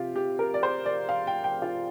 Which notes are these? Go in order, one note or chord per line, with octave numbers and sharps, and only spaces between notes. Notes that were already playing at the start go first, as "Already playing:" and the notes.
Already playing: C3 F4 G4
G4
A#4
D5
C5
D5
F5
G5
G5
F4